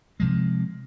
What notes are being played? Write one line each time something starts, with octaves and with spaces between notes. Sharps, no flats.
C3 F3 G#3